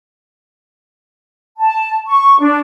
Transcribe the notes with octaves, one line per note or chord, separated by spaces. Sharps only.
A5
C#6
D4